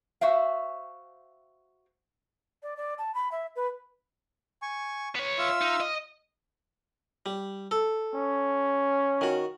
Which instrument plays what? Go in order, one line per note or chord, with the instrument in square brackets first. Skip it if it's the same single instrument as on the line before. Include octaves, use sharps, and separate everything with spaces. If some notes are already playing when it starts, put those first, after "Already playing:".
[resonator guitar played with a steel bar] F#4 C5 E5 F5
[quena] D5
D5
A5
B5
E5
B4
[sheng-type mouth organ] G#5 C#6
[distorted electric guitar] B3 C#5
[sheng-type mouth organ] F4 E5 E6
[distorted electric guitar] D#4
D#5
[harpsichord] G3
A4
[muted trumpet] C#4
[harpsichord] D#3 F#4